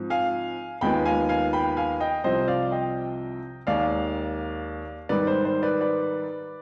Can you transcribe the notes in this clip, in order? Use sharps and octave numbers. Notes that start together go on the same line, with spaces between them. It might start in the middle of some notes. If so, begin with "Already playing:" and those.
Already playing: G#2 F3 C4
F5 G#5
D#2 D#3 G#3 B3 F4 G5 B5
F5 G#5
F5 G#5
G5 B5
F5 G#5
D#5 G5
C2 C3 F3 C4 C5 D#5
D5 F5
D#5 G5
D#2 D#3 G#3 D5 F5
G#2 D#3 G3 B4 D5
C5
C5
B4 D5
B4 D5